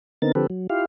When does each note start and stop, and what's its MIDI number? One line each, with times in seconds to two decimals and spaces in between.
0.22 0.32 50
0.22 0.32 59
0.22 0.32 60
0.22 0.32 63
0.22 0.32 70
0.22 0.32 93
0.35 0.47 50
0.35 0.47 53
0.35 0.47 60
0.35 0.47 67
0.35 0.47 69
0.35 0.47 71
0.50 0.67 54
0.70 0.85 64
0.70 0.85 65
0.70 0.85 67
0.70 0.85 77